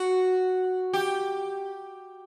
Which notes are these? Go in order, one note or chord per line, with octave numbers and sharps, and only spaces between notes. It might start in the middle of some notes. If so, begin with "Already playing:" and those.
Already playing: F#4
G4